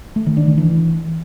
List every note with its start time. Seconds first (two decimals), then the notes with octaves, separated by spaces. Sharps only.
0.16 A3
0.26 D#3
0.37 D4
0.47 D#3
0.58 E3